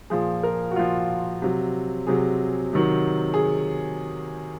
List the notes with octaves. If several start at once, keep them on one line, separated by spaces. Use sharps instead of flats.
A#2 F3 G#4
A#4
F#4
A#2 F3 F4
C3 F#3
C3 F#3 G#4
C3 D#3 F#3
G#4